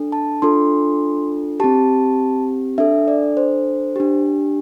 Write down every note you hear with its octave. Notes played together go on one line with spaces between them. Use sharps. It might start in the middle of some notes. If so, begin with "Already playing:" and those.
Already playing: D4 A4
A5
D4 F4 A4 C6
C4 G4 A5
D4 A4 E5
D5
C5
D4 G4